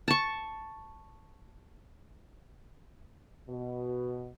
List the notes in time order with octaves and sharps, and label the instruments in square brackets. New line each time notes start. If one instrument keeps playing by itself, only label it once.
[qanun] A5 C#6
[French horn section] B2